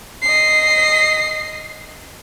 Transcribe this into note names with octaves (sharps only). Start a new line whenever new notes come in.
D#5 C7